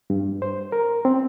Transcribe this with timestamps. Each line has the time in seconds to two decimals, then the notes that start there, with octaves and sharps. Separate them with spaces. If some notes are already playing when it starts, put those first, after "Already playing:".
0.10 G2
0.42 C5
0.72 A#4
1.05 C4